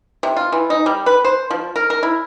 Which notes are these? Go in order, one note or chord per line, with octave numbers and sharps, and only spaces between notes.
C3
F4
E3
D#4
G3
B4
C5
F3
A#4
A#4
E4